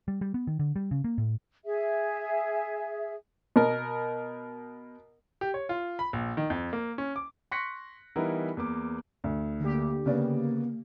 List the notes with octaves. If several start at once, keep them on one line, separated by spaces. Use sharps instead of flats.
G3
G3
B3
D#3
D3
G3
C#3
A#3
A2
G#4 E5
B2 A#4
G4
C#5
F4
B5
A#1
D#3
F2
A#3
C#4
D6
C6 C#6 F#6 A#6 B6 C#7
E3 G3 B3 D#4 E4 A#4
E2 A#3 D6
D2
D3 A#3 G4
C#3 A#3 B3 D5